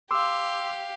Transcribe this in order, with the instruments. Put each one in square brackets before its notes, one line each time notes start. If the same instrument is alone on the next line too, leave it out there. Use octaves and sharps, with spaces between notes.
[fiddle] G4 F5 [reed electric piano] C6 D6 E6